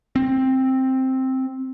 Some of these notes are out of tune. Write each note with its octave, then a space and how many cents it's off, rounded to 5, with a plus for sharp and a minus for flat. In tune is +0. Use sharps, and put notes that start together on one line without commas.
C4 +5